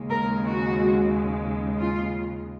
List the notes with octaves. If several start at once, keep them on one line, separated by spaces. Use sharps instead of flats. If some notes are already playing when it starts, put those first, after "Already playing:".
Already playing: D#2 C#3 G#3
A#4
F#4
F4